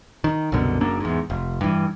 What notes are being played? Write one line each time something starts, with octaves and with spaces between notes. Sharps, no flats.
D#3
C2 F#2 B2 D3
F#1 F#2 A#3 D4
E2 G#2
F1
G2 E3